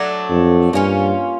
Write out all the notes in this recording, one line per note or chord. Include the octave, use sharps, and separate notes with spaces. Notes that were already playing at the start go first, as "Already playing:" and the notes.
Already playing: F#3 A3 D4
F2
G2 A#3 C#4 F4